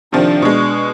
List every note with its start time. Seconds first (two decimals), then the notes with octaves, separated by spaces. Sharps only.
0.13 C3 D#3 F3 D4
0.42 B2 G#3